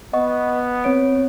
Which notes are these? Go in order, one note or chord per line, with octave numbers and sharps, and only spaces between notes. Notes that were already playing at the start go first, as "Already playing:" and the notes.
B3 D#5 F#5 C#6
C4 C#5 D7